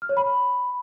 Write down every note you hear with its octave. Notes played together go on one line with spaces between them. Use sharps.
F6
C#5
B5